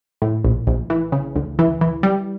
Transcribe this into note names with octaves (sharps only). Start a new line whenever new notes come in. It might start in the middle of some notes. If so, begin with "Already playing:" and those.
A2
A#1
A#1
E3
C#3
D2
E3
E3
G3